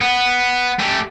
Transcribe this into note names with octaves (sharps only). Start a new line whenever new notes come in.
B3
A3 G4